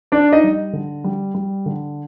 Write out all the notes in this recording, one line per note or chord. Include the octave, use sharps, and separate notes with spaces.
D4 D5
D#4 D#5
G3
D3
G3
G3
D3